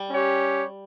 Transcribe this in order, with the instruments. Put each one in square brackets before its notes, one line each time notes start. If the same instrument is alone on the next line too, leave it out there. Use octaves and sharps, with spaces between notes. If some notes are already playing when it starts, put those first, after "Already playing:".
Already playing: [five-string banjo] G3
[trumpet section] C#4 G4 C#5